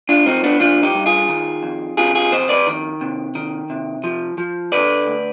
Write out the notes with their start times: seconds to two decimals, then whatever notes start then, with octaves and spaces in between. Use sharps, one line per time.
0.09 D4 F4
0.26 F3 C4 D#4
0.44 B3 D4
0.60 F3 D4 F4
0.83 D#4 G4
0.95 G2
1.06 F4 G#4
1.29 D#3
1.63 F2
1.97 C3 F4 G#4
2.15 F4 G#4
2.32 F2 C5 D#5
2.49 B4 D5
2.67 D#3
3.01 C3
3.35 D#3
3.70 C3
4.04 F3
4.38 F3
4.72 D3 B4 D5
5.07 D2